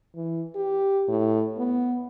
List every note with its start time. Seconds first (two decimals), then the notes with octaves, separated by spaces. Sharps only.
0.15 E3
0.56 G4
1.09 A2
1.58 B3